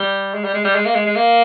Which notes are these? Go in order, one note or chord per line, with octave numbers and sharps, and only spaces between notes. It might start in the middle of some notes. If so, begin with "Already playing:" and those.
Already playing: G3
G#3
G3
G#3
G3
G#3
A#3
G#3
G#3
A#3